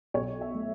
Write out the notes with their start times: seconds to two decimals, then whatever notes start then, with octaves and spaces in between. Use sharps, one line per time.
0.14 B1 C#5
0.41 E5
0.55 A3